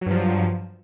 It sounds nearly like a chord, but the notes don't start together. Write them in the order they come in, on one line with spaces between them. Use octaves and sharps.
F#3 G2 F3